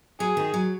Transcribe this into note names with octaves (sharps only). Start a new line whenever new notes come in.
F#3 G#4
D#3
F#3